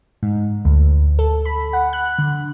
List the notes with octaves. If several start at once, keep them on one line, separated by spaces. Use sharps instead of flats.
G#2
D2
A4
B5
F#5
F#6
D3